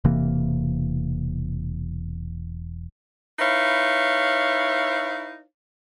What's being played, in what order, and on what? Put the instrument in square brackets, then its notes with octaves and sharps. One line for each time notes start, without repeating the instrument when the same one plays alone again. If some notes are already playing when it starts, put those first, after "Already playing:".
[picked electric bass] E1 C3 E3 A#3
[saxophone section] D#4 E4 B4 C#5 F5